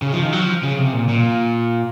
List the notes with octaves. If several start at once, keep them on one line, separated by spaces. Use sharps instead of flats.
C#3
F3
D#3
F#3
F3
C#3
C3
A#2
A#2